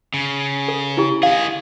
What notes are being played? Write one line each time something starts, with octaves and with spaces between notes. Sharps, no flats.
C#3
A4
E4 G4
D#3 G#4 F5